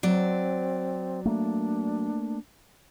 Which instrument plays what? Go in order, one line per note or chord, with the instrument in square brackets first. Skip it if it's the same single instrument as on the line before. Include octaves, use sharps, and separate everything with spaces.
[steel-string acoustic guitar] F#3 D5 [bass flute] C4
[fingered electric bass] A3 A#3 [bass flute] D4